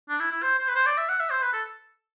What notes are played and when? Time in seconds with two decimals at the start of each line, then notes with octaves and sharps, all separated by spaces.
0.09 D4
0.20 E4
0.32 E4
0.43 C5
0.59 C5
0.68 B4
0.76 C5
0.86 D5
0.98 E5
1.09 F#5
1.20 E5
1.31 C5
1.42 B4
1.53 A4